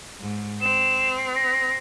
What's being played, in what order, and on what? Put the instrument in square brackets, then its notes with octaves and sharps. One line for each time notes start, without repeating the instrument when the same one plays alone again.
[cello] G#2
[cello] C4 [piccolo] E7
[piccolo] A#6